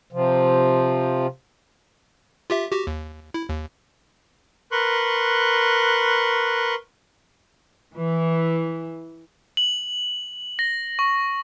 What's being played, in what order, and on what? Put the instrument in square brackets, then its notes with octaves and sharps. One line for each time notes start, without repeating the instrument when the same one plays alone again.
[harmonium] C3 F3
[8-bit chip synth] F4 G4 E5
F#4 G4
D#2
E4
D#2
[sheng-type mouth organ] A#4 B4 C6 C#6 F#6
[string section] E3
[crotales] F#7
A#6
C#6